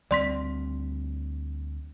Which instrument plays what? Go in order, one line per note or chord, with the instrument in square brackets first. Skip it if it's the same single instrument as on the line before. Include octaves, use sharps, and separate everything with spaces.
[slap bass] D2 G3 C4 [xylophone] D5 C6 B6